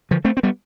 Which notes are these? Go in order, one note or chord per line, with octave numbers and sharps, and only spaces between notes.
D3 F3
A3 C4
C4
G3 B3